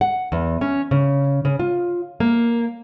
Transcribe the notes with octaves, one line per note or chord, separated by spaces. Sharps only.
F#5
E2
C#4
C#3
C#3
F4
A#3